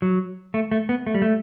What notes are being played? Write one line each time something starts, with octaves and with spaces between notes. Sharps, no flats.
F#3
A3
A3
B3
A3
G3
A3